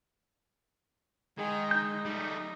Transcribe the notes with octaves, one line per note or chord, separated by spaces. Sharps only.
D#3 G#3 G#5
D#4 G6
G3 A3